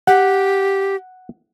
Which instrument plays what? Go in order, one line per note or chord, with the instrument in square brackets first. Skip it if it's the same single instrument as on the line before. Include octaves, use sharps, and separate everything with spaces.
[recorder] G4 [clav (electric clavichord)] F#5